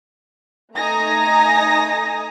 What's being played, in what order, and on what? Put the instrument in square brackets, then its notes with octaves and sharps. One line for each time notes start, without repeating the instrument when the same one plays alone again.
[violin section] A3 D#4 G#5 A#5 D#6 A#6